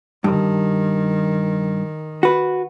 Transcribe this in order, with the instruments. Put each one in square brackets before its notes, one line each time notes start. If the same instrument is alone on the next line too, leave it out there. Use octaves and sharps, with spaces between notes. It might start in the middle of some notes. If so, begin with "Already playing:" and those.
[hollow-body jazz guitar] G2 [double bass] D#3
[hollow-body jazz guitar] F#4 B4